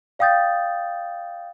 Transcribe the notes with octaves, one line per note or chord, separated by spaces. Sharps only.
D5 F5 G5 D#6 G6 A6